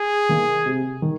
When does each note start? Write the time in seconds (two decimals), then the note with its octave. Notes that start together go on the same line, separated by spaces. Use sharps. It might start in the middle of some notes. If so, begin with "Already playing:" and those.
Already playing: G#4
0.29 D#3 A#3 D#4
0.66 C3
1.02 D#3